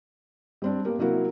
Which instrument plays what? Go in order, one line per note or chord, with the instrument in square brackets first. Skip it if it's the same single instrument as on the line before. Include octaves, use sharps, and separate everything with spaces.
[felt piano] G3 C4 D4
A#3 B3 G4 A#4
C3 F#3 A#3 E4 F#4 A#4